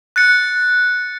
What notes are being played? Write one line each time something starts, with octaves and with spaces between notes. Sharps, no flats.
F#6 A6 C#7